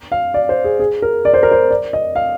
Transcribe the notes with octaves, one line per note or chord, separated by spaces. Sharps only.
F5
D5
C5
G#4
G#4
A#4
D5
C5
A#4
C5
D5
D#5
F5